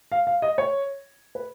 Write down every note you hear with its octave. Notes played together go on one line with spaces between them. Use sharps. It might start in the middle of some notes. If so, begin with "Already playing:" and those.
F5
F5
D#5
C#5
B4